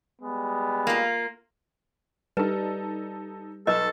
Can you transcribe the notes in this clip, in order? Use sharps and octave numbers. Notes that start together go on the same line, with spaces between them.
G3 G#3 B3
A#3 F4
G3 D#4 A4 B4
B1 A4 B4 D#5